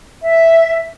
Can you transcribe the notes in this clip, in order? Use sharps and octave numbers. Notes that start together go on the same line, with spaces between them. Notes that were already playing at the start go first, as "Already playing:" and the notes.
E5